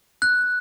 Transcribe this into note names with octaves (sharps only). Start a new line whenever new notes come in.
F#6